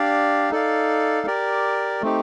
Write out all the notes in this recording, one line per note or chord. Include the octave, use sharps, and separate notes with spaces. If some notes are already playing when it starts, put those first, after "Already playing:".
Already playing: D4 G4 D5 F5
D#4 A4 D5 F5
G4 A#4 D5
A3 C4 D#4 G4